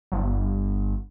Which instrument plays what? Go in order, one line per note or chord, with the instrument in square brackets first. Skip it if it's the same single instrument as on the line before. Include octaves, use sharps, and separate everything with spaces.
[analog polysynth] G1